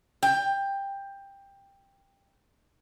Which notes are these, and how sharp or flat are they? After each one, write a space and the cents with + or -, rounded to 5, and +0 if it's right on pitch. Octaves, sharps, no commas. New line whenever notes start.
G5 +15